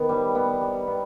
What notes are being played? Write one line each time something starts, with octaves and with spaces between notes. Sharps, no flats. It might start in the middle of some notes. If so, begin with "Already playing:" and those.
Already playing: D#3 B3
G3
B3
G3
B3